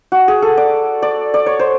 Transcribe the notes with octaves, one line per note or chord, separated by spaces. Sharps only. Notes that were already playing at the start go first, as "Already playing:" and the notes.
F#4
G#4
A4
D5
D5
D5
C#5
C5